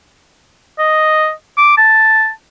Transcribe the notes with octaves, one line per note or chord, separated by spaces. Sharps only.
D#5
D6
A5